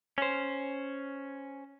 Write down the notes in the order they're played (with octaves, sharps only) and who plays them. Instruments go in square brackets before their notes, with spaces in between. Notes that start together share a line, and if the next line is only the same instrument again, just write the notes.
[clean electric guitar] C#4 C5